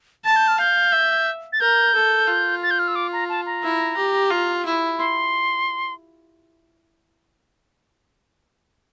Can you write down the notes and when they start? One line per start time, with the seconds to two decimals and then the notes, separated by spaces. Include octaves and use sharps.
0.24 A5 A6
0.36 G6
0.48 F6
0.59 F5 G6
0.93 E5
1.53 A6
1.60 A#4 G6
1.95 A4
2.28 F4
2.63 A6
2.71 G6
2.79 F6
2.88 E6
2.95 D6
3.13 A#5
3.29 A5
3.46 A#5
3.63 E4
3.96 G4
4.30 F4
4.65 E4
4.99 C6